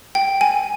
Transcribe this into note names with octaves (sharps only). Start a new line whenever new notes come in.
G5
G#5